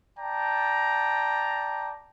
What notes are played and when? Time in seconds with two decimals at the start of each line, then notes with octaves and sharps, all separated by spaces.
0.19 D5 G5 A5 A#5